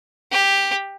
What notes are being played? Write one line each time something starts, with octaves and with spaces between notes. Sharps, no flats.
G4